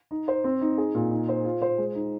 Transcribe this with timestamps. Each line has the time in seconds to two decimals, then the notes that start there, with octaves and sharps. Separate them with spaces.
0.11 D#4
0.28 C5
0.44 C4
0.61 D#4
0.78 G#4
0.95 A#2
1.11 D#4
1.29 C5
1.45 F4
1.62 C5
1.78 G#3
1.95 D#4